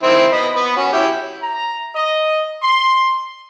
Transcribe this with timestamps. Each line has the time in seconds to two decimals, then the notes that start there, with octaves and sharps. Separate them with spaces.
0.03 D#3 C4 E4
0.32 B3 D#5 B5
0.55 B3 B4
0.77 C#4 F#4
0.93 E4 G4
1.42 A#5
1.95 D#5
2.62 C6